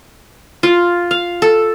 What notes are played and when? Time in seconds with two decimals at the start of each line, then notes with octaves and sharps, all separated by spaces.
0.63 F4
1.11 F5
1.42 A4